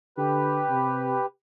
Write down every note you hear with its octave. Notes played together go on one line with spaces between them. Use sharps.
D3 G4 B4
C3